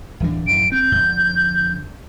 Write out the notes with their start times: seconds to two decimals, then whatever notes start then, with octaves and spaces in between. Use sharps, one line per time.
0.20 D1 E3 D4
0.47 D1 F#2 E3 D7
0.72 C4 G6
0.92 F2 D3